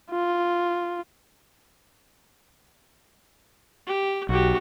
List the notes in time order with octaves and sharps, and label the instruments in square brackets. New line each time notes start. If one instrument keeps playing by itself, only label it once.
[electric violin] F4
[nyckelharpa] G4
[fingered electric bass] B1 [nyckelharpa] F#4 G4